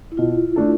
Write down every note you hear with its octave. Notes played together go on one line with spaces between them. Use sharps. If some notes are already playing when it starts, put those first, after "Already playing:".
E4
B2 F4
A3 D4 A4